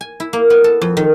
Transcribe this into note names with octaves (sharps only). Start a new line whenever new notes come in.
G#5
E4
A#3
B3
A4
F2
D#3